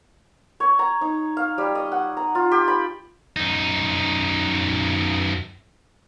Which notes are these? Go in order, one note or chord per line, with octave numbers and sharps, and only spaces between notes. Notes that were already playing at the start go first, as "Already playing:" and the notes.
C#5
A#5
D#4
F5
G3
D#5
F#5
A#5
F4
G4
B5
F#2 D#4